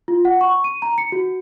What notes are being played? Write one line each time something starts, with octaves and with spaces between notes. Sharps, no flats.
F4
F#5
C#6
D#7
A#5
C#7
F#4